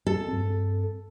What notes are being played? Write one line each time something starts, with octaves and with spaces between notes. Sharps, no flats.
A4
G2 C4